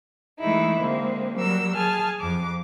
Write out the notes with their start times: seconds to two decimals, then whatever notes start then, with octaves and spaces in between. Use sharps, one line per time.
0.41 E3 G#3 A3 D#4 E4
0.80 D3 G#3 A#3 C4
1.35 F#3 G3 A#4 E6
1.75 G#4 G#5 A5 F6
2.20 F2 D6